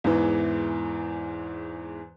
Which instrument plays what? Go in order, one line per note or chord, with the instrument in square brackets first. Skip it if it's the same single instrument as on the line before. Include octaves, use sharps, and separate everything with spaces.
[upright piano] E2 G#2 E3